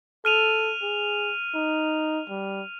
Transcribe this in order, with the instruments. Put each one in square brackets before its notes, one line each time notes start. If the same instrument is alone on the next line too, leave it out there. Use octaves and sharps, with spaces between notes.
[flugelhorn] A4 [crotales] F6 D#7 F7
[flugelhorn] G#4
D#4
G3